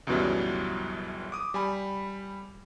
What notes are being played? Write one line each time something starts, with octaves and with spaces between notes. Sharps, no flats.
C#2 F#2 B2 E3 F#3 G3
D6 D#6
G3 G#5 B5